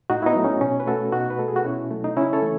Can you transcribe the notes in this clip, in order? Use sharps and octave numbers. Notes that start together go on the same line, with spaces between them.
A2 D#4 F#4
E4
B3 D#4
F#3 A3
C#4
B2 C#4
B4
A3 F#4 A4
B2 D#4 F#4
B4
A3 A4
G#4
F#4
B2 C#4 E4
F#3 A3
D#4
C#3 C#4 E4
A4 C#5
E3 A3